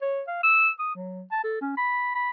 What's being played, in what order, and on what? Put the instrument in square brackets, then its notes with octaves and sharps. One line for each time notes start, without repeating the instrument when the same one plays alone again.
[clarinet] C#5
F5
E6
D#6
F#3
A5
A4
C#4
B5
B5